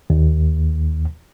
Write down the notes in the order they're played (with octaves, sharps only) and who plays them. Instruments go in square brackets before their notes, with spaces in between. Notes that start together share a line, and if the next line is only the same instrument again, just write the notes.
[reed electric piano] D#2